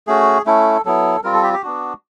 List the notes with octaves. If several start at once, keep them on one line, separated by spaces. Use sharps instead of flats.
A3 C#4 F#4 G#4
A3 C#4 E4 A4
F#3 B3 E4 A4
G3 C4 F4 A#4
A4
G4
G4
B3 D4 F#4